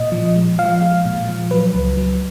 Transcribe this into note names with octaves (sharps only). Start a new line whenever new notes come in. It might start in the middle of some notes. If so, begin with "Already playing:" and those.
Already playing: A#2 D#5
F3
G#3
F3 F5
G#3
A#2
F3
F#3 B4
C#2
F#3